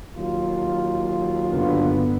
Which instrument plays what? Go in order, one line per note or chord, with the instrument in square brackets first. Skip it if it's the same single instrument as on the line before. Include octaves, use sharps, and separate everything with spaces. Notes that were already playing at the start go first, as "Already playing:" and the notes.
[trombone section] D#2 F#3 F4
[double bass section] G2 D3 B3